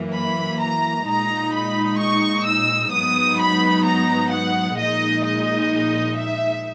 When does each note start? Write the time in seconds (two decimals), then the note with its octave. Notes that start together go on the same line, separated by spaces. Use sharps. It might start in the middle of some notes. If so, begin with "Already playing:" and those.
Already playing: F#2 E3 A#3
0.14 B5
0.60 A#5
1.06 A#2 G#3 D#4 A#5
1.53 B5
1.98 C#6
2.45 E6
2.91 G#2 F#3 B3 D#4 D#6
3.38 B5
3.84 A#5
4.31 F#5
4.77 A#1 A#2 G#3 D#4 D#5
5.23 D#5
6.16 E5